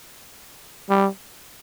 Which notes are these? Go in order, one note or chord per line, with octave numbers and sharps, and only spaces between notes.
G3